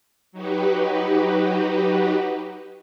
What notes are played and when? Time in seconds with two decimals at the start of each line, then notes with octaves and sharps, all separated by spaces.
0.32 F#3 D#4 F#4 G4 B4